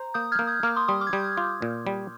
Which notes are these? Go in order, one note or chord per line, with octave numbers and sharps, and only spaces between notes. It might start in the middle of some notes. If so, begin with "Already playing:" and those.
Already playing: C5 A#5
A#3 D#6 G6
F6 G#6
A#3
D#6 G6
A#3 D6 F6
C6 D#6
G3 C6 D#6
D6 F6
G#6
G3 D#6 G6
F4
A#2
G3